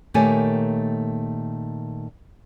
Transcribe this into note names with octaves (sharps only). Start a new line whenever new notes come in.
A#2 D#3 A3 G4 C#5 G#5